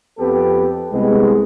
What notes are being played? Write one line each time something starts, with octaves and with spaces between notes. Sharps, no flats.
F2 B3 C4 G4 A4 B4
C2 G#3 B3